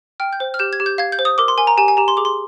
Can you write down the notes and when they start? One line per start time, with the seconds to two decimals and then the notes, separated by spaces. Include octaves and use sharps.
0.20 G5 F6
0.33 G6
0.40 C5
0.54 F6
0.59 G4 G6
0.73 G#6
0.80 G4
0.86 G6
0.98 F5 G#6
1.12 G6
1.19 C5
1.25 D#6
1.38 A#4 D6
1.48 C6
1.58 A#4 G#5
1.67 A#5
1.77 G4 G#5
1.88 G#5
1.97 G4 A#5
2.08 C6
2.17 G#4 D6
2.25 C6